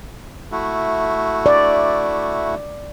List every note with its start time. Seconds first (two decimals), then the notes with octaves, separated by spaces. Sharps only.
0.52 A3 E4 F#4
1.46 D5